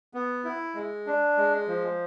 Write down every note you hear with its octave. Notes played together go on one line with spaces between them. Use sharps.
B3
E4
G#3
D4
G#3
F3